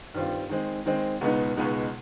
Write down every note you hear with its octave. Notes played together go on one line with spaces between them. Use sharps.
G2 D#3 G3 C4 F4
D#3 G#3 C4
D#3 G#3 C4
C#2 B2 G#3 B3 D#4
C#2 B2 G#3 B3 D#4